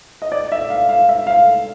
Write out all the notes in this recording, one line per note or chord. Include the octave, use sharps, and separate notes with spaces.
D#5
D5
E5
F5
F5
E5
F5